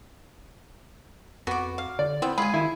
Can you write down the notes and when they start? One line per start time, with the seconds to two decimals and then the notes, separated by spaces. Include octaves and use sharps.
1.47 F2 B3 F#4 B4 D6
1.78 F5
1.99 D3 D5
2.22 B3 C4 E4
2.38 G#3 F4 G#4 G#5 B5
2.54 D#3 E4